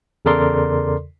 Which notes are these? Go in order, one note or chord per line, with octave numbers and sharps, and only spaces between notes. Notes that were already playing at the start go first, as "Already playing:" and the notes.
E2 C#3 A4 A#4 D5 C6